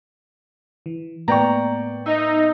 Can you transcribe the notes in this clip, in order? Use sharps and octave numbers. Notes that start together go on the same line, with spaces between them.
E3
A2 A#3 B3 D5 G5 A#5 C#6
D#4 E5